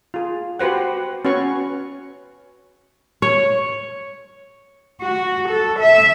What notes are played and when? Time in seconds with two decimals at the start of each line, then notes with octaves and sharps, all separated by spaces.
0.14 F4 G#4
0.59 F#4 G4 B4 C5 F#5
1.25 C#4 F#4 B4 C#5 C#6
3.22 C#5
5.02 F#4
5.49 A4
5.80 E5